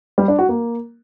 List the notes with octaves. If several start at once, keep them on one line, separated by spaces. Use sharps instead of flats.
G3
D4
F#4
A#3